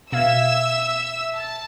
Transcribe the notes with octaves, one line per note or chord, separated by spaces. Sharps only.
B2 E5 F5 E6 G#6
A5